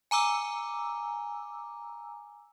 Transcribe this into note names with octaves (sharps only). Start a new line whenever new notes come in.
G#5 A#5 D6 E6